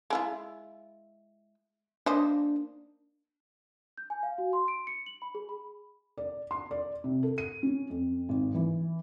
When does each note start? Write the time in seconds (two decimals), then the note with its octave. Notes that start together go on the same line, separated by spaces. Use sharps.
0.10 G#3 E4 F4
2.06 A#3 D4 C5 D#5
3.98 G6
4.10 G#5
4.23 F5
4.38 F#4
4.53 C6
4.68 D7
4.87 C#7
5.06 F#7
5.22 B5
5.35 G#4
5.49 B5
6.18 D5
6.51 C6
6.71 D5
7.04 C3
7.23 A4
7.38 D#7
7.63 C#4
7.90 F2
8.29 G#1
8.55 E3